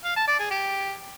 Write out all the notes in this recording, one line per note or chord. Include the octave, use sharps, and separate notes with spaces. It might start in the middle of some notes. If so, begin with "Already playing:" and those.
F5
A5
D5
G#4
G4